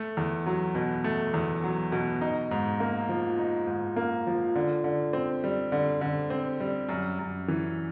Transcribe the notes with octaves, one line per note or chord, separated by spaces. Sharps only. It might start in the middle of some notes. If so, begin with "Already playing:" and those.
Already playing: A3
E2
F#3
B2
A3
E2
F#3
B2
D#4
G#2
A#3
F3
D#4
G#2
A#3
F3
D3
D3
C4
G3
D3
D3
C4
G3
F#2
F#2
E3